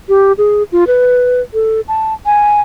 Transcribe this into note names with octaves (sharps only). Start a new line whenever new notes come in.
G4
G#4
F4
B4
A4
A5
G#5